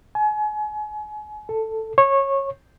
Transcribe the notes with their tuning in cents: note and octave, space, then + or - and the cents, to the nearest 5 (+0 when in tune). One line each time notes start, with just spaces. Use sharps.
G#5 +35
A4 +5
C#5 -20